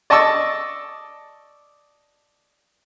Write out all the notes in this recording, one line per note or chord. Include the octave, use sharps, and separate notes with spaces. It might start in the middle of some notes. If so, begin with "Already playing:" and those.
D5 D#5 A5 C#6 E6